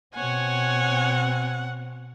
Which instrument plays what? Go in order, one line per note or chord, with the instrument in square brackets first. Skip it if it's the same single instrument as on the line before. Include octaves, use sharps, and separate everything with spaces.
[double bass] B2 C4 [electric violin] C#5 G#5 [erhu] F#5